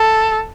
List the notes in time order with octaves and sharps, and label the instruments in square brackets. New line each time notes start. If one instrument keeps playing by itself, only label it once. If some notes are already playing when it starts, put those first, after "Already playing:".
Already playing: [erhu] A4